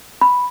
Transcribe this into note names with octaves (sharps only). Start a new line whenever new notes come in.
B5